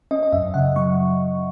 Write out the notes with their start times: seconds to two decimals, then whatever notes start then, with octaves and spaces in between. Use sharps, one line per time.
0.11 C#4 D#5
0.23 D#5
0.33 F#2 E5
0.54 C#3 F#5
0.76 F#3 C#6